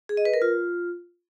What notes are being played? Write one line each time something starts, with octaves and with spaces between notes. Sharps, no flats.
G#4
D#5
B4
A#4
F4